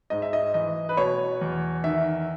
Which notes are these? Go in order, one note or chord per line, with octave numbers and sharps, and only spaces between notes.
G#2 D#5
E5
D#5
E3 D#5
B4
B2 C#5
E2
D#3 E5